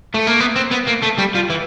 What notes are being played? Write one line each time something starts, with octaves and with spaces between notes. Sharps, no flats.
A3
A#3
B3
C4
B3
A#3
A3
G3
F3
E3